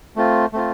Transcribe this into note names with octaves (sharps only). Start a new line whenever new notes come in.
A3 C4 F4
A3 C4 F4